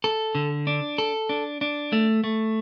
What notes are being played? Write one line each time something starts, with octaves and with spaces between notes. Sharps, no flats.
A4
D3
D4
A4
D4
D4
A3
A3